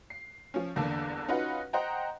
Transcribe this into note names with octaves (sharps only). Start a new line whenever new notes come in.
C7
F3 C#4
G1 E2 D3 A#3 D4
C#4 D#4 F4 F#4 B4 F#5
C5 D#5 F#5 G5 A#5